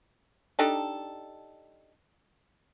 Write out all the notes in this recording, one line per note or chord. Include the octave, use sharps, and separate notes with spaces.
D4 D#4 G4 A4